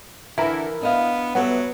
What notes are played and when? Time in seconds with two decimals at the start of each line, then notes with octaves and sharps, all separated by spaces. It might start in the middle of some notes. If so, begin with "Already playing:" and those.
0.38 D3 E3 E4 A#4 E5
0.81 B3 D4 D#5 F5
1.35 F#3 G3 B3 A4 E5